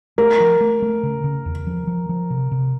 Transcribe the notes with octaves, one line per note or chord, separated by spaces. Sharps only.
A3 A#4
F3
A3
A3
C#3
C#3
E2
F3
F3
F3
C3
C3